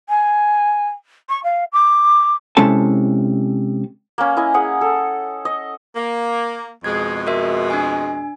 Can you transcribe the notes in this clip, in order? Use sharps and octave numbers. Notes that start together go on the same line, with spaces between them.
G#5
C#6
F5
D6
C3 G#3 C#4 E4 A4 A5
A#3 C#4
E4 D#5 G#5
G#4 F#5 D#6
A4
D#5
A#3
F2 B2 G#3 G#6
F#4 A#4 E5
D4 G#5